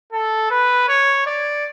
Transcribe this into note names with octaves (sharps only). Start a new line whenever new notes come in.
A4
B4
C#5
D5